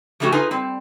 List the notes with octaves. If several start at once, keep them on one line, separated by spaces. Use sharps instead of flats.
F3 G3 A3 C#4 F#4 G4
D#4 F4 G#4 B4 G#5
G3 C4